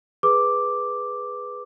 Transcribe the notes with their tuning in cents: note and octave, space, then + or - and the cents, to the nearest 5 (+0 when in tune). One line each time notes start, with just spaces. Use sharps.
G#4 +0 B4 +0 D6 +0